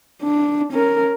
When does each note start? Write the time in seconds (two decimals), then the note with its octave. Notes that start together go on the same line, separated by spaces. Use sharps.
0.23 D4
0.72 C#4 A#4